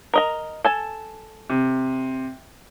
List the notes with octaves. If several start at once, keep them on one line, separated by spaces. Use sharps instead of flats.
A#4 D#5 A#5
A4 G#5 A5
C3